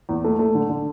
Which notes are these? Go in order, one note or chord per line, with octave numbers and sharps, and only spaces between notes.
E2
A3
A3
D3
D3